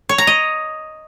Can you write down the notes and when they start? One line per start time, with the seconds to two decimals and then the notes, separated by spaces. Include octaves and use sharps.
0.09 C#5
0.18 A#5
0.27 D#5